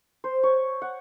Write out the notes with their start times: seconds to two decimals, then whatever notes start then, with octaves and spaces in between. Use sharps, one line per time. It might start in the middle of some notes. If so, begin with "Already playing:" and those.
0.24 C5
0.43 C#5
0.82 F#5